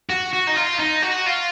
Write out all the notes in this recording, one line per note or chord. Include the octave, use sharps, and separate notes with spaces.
F#4
F#4
D#4
F4
D#4
F#4
F4